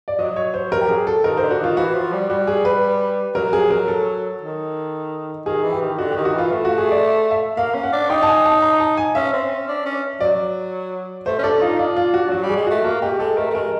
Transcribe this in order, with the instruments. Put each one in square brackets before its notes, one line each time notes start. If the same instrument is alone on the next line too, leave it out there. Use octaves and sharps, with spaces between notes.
[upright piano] D5
[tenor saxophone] F#3 [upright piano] D#5
[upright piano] C#5
C5
A#4
G4
G#4
A4
[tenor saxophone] D#3 [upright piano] A#4
[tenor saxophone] D3 [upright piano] C5
[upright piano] F#4
[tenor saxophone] D#3 [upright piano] F4
[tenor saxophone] E3 [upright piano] F#4
[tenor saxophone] F3
G3
[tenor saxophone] G3 [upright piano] F#4
[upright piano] G#4
B4
[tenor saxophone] F#3 [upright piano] A#4
[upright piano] G#4
A#4
A4
[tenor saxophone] D#3
[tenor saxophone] D#3 [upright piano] G#4
[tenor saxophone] E3
[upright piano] G4
[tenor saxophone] D#3
[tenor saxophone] D3 [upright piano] F#4
[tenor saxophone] D#3 [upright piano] G4
[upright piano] F#4
[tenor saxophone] E3 [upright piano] F4
[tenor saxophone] A3 [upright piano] F4
[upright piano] F#4
G#4
D5
E5
[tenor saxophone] A#3 [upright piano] F5
[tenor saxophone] C#4
[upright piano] F#5
[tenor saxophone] D4
[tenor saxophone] D#4 [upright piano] G5
[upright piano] A5
G#5
A5
A#5
A5
G#5
[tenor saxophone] C#4 [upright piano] E5
[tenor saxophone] C4
C#4
D4
C#4
[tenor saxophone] F#3 [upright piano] D5
[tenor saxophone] A3 [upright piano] C5
[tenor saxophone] C#4
[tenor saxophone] D4 [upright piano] A4
[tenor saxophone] D#4 [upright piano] F4
[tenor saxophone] D4 [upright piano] F4
[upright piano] F4
F#4
[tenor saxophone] F#3 [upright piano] F#4
[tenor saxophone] G3
[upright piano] G#4
[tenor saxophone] G#3
[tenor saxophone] A3 [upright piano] F#4
[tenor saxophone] A#3 [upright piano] F#4
[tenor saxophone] G#3 [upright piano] G4
[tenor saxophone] G#3 [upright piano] A4
[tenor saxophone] A3 [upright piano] A#4
[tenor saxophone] A3
[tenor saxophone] G#3 [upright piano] A#4